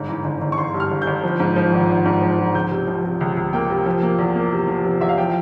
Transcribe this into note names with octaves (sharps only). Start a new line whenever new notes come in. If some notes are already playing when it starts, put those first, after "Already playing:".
Already playing: G1 G#2
E3
G1
G1
C#6
G1 C6
G2
F6
G1
G6
G1
F3
G#2
F3
G#1
G#1
G#2
F3
F3
C#2 G6
C3
F3
C3
C#2
C#2
A#3 G5
C3
F3
A#3
E2
A#3
C3
F3
C3
E2 E5
F5
F3 G5